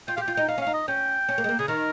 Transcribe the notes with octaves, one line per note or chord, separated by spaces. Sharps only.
F4 G5
G4 F5
G5
F4
D#4 G5
D#4 F5
C#4
F5
D#4
D#5
C#4 G5
C#4
A#3
G#3
A#3
C#3 G#4
D#3 A#4